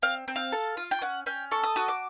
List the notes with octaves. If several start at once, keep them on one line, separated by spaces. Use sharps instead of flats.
C4 F5
C4
F5
A4
F4
G5
C#4 F#5
C#4 G5
A4 C#6
D#6
F#4 D#6
D6